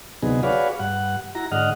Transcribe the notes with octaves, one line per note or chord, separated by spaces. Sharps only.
D2 C3 F#3 B3 D#4 G#4
F#4 G#4 B4 C#5 D5 F5
G2 F#5
E4 F#4 A#5
G#2 D3 D#5 F#5 F6